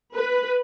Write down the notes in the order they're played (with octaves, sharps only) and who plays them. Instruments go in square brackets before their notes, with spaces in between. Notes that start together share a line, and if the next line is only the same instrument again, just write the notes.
[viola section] B4